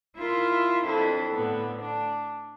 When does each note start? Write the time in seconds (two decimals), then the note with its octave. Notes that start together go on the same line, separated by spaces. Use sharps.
0.16 E4 F4 A#4 E5 C6
0.84 F2 D4 E4 A4
1.31 A2 D3 B3
1.79 D4